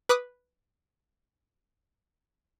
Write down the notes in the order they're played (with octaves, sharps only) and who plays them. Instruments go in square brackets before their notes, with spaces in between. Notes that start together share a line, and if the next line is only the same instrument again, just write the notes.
[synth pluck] B4 D6 D#6 F#6